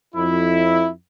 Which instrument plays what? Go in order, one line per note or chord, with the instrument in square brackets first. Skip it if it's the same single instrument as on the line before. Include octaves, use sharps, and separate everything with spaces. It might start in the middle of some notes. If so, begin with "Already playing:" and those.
[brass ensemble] F2 E4